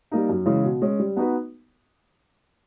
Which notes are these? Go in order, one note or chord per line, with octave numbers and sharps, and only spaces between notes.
G3 A#3 D#4
F#2
C#3 E3 G#3
B2
G#3 C#4
G3
B3 D#4 F#4 B4